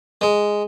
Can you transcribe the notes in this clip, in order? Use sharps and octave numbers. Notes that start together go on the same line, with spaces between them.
G#3